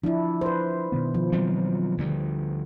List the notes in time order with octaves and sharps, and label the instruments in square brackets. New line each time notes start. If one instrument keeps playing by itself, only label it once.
[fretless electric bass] F3 [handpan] D4 E4
[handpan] B4 C5
[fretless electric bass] B2 D#3 B3
[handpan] F3
[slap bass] F#3 G3 C4
D2 D3 G3